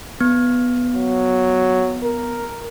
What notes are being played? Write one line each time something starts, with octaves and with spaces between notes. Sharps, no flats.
B3
F#3
A#4